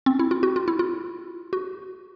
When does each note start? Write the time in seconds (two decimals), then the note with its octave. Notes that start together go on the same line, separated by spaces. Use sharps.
0.06 C4
0.19 E4
0.31 F4
0.43 F#4
0.56 F4
0.68 E4
0.79 F4
1.53 F#4